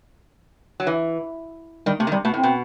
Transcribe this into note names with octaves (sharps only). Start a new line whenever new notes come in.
F#3
E3
D#3 G3
C3 A3
D#3
C3 G3
B2 A3
A2 C4
B2